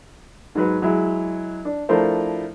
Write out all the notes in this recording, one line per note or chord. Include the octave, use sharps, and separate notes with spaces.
G#2 F#3 B4
F#3 G#3 E4
D4
F3 A3 D4 E4 A#4 C5